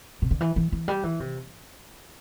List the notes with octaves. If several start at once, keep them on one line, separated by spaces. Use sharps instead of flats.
C3
D3
E3
E3
E3
G3
E3
C3